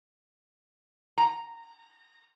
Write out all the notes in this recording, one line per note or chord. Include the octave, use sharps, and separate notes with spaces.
A#5